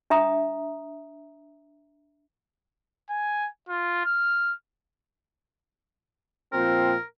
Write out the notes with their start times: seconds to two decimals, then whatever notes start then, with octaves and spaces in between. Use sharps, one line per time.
0.10 D4 E5 A#5 D#6
3.10 G#5
3.69 F4
4.05 F6
6.53 A#2 F3 C4 A#4